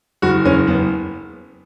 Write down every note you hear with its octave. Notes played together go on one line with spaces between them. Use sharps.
F#1 F#4
F#1 C#4
F#1 B3